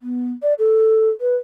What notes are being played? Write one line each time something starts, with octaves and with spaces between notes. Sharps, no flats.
B3
D5
A4
B4